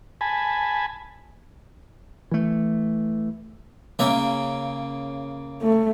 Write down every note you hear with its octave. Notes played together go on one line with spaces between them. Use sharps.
G#5 A5 B5
E3 A3
C#3 A#3 E5
A3